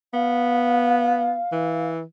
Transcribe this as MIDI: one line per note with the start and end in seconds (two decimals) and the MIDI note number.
0.14 1.40 59
0.14 1.89 77
1.52 2.02 52